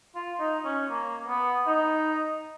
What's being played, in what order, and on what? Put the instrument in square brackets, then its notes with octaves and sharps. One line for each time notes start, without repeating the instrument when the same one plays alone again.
[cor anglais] F4
D#4
C#4
A#3
B3
D#4